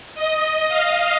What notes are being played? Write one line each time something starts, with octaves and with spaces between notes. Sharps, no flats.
D#5
F5